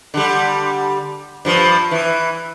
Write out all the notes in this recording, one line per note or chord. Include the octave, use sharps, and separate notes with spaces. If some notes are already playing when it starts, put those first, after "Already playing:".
D3 G3
G2 F3
E3